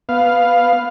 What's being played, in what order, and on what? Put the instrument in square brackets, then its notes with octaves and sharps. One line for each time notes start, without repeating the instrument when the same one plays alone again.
[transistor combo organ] B3 F5